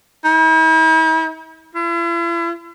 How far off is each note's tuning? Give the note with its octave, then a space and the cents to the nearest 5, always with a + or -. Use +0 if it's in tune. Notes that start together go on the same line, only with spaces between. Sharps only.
E4 -45
E4 +45